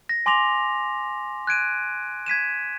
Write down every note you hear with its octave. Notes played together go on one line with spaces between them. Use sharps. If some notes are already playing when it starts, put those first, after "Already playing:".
A#6
G#5 C6 D6 A#6 F7
F#6 G#6 D7 D#7
G#6 B6 D#7 E7